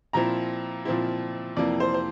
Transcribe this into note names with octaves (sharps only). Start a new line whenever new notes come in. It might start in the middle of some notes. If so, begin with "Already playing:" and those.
A#2 F3 C4 E4 A#5
A#2 F3 C4 E4
F2 C3 E3 A#3 D5
C5
C5